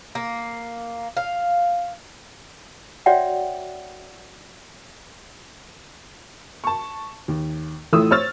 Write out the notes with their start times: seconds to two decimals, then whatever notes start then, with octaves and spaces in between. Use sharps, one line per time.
0.15 A#3
1.17 F5
3.06 F#4 C#5 D5 E5 F#5 G5
6.64 A5 C#6
7.28 D#2
7.93 A1 A2 A3 F4 D#6 E6
8.11 C5 C#5 C#6 E6 F6 A6